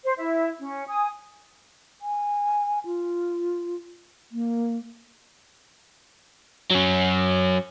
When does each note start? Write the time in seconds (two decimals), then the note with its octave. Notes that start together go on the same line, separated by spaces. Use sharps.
0.04 C5
0.18 E4 E5
0.60 C#4
0.89 G#5 D#6
2.01 G#5
2.85 F4
4.32 A#3
6.71 F#3 C#4